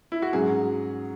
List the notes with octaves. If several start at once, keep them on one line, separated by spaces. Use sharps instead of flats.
E4
F#4
G#2 F#3 C#4 G#4